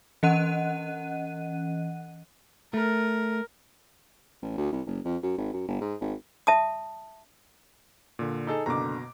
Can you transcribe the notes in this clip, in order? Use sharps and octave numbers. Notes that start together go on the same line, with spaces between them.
E3 C#4 D#5 F#5 F#6 D#7
A3 A#4
A1
D2
C2
F#1
F2
F#2
G#1
F#2
G1
G#2
G#1
E5 A5 D#6
A#2 D3
D#4 G#4 A4
F#1 B2 D3 A#5 D6